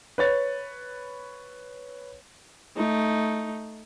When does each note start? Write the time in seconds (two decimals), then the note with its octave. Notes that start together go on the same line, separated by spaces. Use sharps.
0.18 B4 C#5 A6
2.77 A3 D#4